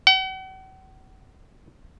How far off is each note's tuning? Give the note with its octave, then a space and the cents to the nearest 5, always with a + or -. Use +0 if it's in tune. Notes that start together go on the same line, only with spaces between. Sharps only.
F#5 +45